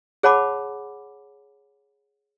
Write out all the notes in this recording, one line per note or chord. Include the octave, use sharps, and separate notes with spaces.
G#4 C#5 F#5 A5 B5 D6